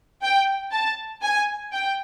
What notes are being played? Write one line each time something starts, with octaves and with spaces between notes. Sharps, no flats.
G5
A5
G#5
G5